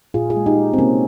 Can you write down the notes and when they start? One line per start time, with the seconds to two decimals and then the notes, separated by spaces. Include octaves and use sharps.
0.14 A#2 F4 G#4
0.30 F4 G#4
0.36 G#3
0.46 D#4 G4
0.58 G#3
0.74 C4
0.78 C3 A#3 C#4